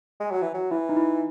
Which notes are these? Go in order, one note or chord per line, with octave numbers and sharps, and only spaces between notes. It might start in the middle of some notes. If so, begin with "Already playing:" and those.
G#3
F#3
E3
F#3
E3 E4
D#4
E4